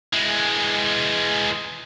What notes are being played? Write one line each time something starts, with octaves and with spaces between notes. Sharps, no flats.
E3 G#3